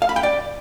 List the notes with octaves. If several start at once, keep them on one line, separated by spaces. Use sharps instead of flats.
F5
B5
G5
D5